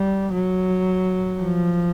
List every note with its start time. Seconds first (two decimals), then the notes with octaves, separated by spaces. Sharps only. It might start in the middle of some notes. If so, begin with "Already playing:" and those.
Already playing: G3
0.33 F#3
1.40 F3